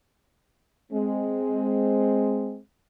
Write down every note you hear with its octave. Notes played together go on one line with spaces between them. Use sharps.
G#3 C4